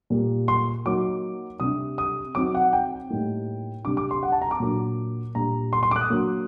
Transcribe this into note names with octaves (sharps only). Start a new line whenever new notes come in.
A#2 G3 A#3
C6
F#3 A#3 D#4 D6
C3 G3 D4 D#6
D#6
F#3 C4 D#4 D6
F#5
G5
A2 G3 A#3 D#4
C3 G3 D4 D6
D6
C6
F#5
A5
A#5
D6
A#2 F#3 A#3 D4
A#2 G3 D4 A#5
C6
C6
D6
F#6
D#6
F#3 A#3 D4